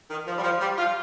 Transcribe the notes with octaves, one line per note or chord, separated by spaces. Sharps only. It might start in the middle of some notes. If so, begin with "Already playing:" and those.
D#3
F3
G3
F3
G3
F4